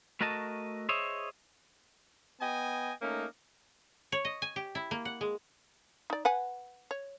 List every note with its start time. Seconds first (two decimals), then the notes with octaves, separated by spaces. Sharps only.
0.21 A3 F#4 A#4 D#5 A5
0.89 G#4 C5 C#5 D#5 E5
2.40 B3 D#5 G5 G#5
3.01 A3 A#3 C#4 D#4
4.12 C#5
4.25 D#5
4.42 G#5
4.56 G4
4.75 E4
4.91 A#3
5.05 F#5
5.21 G#3
6.10 D#4 D5
6.25 B4 F#5 G#5
6.91 C#5